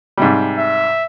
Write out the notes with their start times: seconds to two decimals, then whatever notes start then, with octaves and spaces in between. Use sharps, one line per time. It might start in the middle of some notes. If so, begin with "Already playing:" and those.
0.17 G#2 C3 G3
0.58 E5